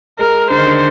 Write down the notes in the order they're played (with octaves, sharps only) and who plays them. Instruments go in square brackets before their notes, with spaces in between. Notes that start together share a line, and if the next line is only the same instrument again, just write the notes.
[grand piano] G#3 [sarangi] A#4
[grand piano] D3 [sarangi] C5
[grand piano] D#3
D3